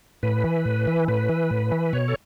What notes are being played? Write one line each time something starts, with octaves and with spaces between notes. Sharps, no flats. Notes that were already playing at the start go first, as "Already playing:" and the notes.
A2 B4
E3
A2
E3
A2 B4
E3
A2
E3
B2 C#5
A4